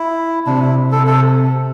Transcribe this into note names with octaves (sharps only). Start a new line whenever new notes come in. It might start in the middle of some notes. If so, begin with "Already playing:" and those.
Already playing: E4
C3 D4
E4
C3 A4
A4